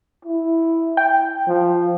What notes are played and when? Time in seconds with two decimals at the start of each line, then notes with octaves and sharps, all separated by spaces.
0.25 E4
0.97 G5
1.47 F3